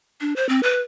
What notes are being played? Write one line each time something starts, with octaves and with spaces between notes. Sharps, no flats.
D4
C5
C4
B4